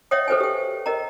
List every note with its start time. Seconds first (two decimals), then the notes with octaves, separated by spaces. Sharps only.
0.11 C#5 D#5 E5 F#5 G5 D#6
0.28 A4 B4 C5 G5 G#5
0.40 G4 G5
0.86 A#4 D#5 G5 A#5